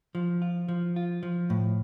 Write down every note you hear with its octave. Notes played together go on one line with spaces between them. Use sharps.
F3
F4
F3
F4
F3
A2